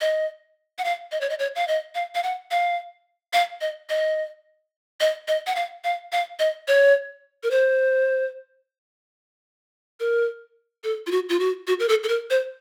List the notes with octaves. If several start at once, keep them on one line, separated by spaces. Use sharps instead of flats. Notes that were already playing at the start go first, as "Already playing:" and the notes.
D#5
F#5
F5
D#5
C#5
D#5
C#5
F5
D#5
F5
F5
F#5
F5
F5
D#5
D#5
D#5
D#5
F#5
F5
F5
F5
D#5
C#5
A#4
C5
A#4
A4
F4
F#4
F4
F#4
F#4
A#4
A4
A4
A#4
C5